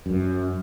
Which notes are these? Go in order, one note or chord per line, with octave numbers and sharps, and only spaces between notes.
F#2